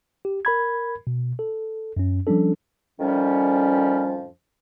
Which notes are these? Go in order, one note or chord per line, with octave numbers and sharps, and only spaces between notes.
G4
A#4 B5 G#6
B2
A4
F#2 C#4
F3 G3 C#4 D4 A4
F2 A2 D#3 F3 G3 C#4